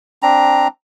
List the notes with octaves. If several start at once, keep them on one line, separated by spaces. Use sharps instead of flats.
C4 D4 A#5